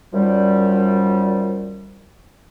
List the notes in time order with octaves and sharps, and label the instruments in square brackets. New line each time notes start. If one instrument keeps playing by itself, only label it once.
[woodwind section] F#2 D#3 F3 G3